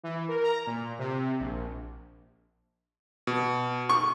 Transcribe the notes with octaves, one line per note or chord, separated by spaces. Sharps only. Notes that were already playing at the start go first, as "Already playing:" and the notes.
E3
A#4
A#5
A#2
C3
A#1
B2
C#6